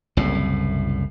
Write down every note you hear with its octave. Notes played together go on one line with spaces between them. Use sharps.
F#1 C2 A2